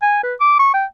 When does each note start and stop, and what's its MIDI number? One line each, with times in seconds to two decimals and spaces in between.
0.02 0.23 80
0.23 0.35 71
0.41 0.56 86
0.59 0.72 85
0.74 0.86 79